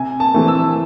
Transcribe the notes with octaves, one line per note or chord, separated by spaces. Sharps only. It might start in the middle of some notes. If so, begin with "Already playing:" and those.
Already playing: C3 G#5
A5
E3 A3 C4
E6